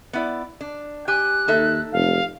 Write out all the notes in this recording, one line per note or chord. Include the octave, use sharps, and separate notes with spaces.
B3 E4 D5
D4
G4 G#5 F#6
D#2 D#4 A4 E5
F1 F5